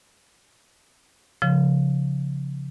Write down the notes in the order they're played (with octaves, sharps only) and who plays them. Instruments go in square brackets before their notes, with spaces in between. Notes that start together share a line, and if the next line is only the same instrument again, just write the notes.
[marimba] C#3 F3